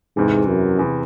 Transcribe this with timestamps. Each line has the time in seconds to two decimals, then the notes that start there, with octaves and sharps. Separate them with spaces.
0.16 E2 G#2 C3 E3
0.47 F#2
0.79 E2 C3 E3